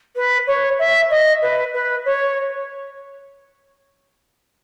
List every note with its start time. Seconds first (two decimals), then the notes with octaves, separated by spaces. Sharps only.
0.16 B4
0.47 C#5
0.79 E5
1.10 D#5
1.42 B4
1.73 B4
2.05 C#5